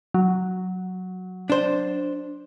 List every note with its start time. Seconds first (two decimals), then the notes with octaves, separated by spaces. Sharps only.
0.14 F#3
1.50 D4 C5